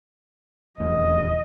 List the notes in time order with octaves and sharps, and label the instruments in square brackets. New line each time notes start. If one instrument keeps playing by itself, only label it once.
[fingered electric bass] D#1 E2 A3 [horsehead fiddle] D#5